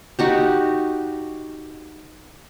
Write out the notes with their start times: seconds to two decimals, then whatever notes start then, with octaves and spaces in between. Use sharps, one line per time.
0.19 D#4 F#4 G4